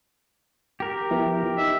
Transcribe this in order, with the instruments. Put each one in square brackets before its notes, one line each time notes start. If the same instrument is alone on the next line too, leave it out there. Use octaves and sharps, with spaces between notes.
[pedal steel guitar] G4 A#4
[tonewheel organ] F3 B3 E4
[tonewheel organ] D#4 [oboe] E5